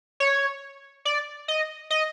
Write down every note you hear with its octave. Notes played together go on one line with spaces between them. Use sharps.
C#5
D5
D#5
D#5